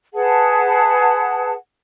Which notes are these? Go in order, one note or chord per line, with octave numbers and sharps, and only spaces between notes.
G#4 B4 F#5 A5